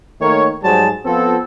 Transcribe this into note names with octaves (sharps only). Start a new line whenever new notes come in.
D#3 A3 A#3 A#4 C#5
G#2 F#3 G3 G#4 C5 A5
F3 B3 C4 F4 A4